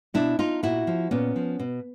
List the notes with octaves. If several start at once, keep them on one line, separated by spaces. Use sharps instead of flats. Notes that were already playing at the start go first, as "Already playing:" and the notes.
B2 D4 E4
D#4 F4
A#2 E4 F#4
F3
A#2 B3 C#4
F3
B2